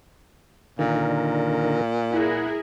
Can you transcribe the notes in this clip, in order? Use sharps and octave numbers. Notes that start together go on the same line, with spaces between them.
A#2 D3 D#3 A#4
E4 G#4 A#4 F#5